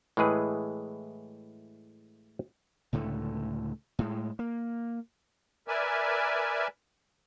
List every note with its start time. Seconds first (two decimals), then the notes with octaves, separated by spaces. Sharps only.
0.17 A2 E3 G#3 G#4 B4
2.93 C#2 A2 D3 A3
3.99 A2 G#3
4.39 A#3
5.68 A#4 B4 D5 E5 G#5